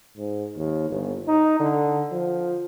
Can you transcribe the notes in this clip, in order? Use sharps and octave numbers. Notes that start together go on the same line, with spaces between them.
G#2
D#2
G1
D#4
D3
F3